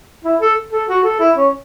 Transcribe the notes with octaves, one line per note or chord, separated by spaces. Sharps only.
E4
A4
A4
F#4
A4
E4
C#4